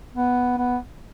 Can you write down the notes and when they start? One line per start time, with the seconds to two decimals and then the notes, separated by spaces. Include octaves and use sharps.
0.14 B3
0.57 B3